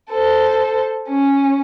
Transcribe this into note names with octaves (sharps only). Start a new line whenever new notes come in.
A4 C5
C#4